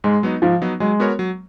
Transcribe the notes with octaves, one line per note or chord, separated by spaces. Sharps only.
G#2 G#3
F#3 B3 D#4
G#2 F3
F#3 B3 D#4
F#3 G#3
B3 F#4 A#4 C#5
F#3